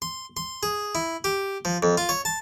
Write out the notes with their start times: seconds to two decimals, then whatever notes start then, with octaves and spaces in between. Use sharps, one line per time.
0.02 C6
0.37 C6
0.63 G#4
0.95 E4
1.24 G4
1.65 F3
1.83 F2
1.98 F4
2.09 C#5
2.25 A5